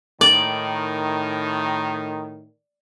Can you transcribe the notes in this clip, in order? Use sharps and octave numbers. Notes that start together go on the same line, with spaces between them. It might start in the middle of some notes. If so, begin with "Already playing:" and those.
A2 D#3 D5